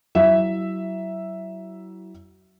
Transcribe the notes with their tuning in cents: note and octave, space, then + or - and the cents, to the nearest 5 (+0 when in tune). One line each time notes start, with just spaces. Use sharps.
F#3 +30 E4 +0 E5 +0